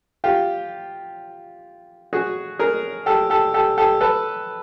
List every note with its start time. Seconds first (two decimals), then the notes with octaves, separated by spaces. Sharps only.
0.24 F4 G4
2.13 F#4 G#4
2.59 G#4 A#4
3.06 G4 A4
3.30 G4 A4
3.54 G4 A4
3.78 G4 A4
4.01 A4 B4